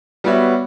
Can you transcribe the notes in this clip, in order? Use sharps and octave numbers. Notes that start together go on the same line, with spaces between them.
G3 B3 F#4 C#5 E5